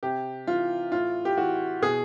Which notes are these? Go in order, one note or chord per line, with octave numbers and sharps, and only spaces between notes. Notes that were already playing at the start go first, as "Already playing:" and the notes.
C3 G4
E3 F4
A2 F4
G4
E3 F#4
B2 G#4